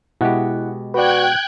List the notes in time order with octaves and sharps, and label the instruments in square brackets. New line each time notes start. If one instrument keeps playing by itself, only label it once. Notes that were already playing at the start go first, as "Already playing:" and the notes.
[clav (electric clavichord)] B2 G#3 G4 [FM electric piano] E4 F#5
[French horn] F#4 [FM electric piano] B4 D5 [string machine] G5 F#6 G#6